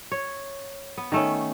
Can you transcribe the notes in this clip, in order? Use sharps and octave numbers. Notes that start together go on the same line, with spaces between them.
C#5
B3
D#3 A3 C#4